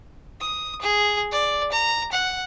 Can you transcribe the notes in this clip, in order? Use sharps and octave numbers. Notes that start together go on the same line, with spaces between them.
D#6
G#4
D5
A#5
F#5